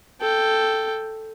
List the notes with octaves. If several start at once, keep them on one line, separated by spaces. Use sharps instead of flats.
A4 G5